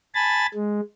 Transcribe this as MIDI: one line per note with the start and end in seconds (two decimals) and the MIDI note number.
0.15 0.46 80
0.15 0.46 81
0.15 0.46 83
0.15 0.46 93
0.54 0.80 56